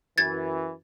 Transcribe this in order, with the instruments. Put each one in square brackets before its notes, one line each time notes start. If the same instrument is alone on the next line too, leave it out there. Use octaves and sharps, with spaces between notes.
[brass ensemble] F#2 E3 [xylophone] G#6 A6